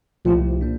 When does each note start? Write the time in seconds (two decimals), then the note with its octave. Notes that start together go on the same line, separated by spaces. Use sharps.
0.25 C2 A#2 F3 A3 E4 G4
0.61 A#3 D4